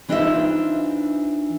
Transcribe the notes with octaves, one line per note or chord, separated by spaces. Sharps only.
E3 D4 D#4 F4 C5 E5